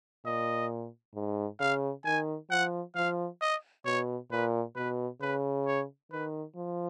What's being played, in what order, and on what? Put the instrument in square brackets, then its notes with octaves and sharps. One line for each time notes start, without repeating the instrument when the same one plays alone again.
[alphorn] A#2 [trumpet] D#5
[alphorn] G#2
[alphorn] C#3 [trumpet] F5
[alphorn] D#3 [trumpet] G#5
[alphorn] F3 [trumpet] F#5
[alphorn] F3 [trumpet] F5
[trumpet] D#5
[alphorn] B2 [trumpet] C#5
[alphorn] A#2 [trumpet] B4
[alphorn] B2 [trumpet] B4
[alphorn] C#3 [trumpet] B4
[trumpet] C#5
[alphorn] D#3 [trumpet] B4
[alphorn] F3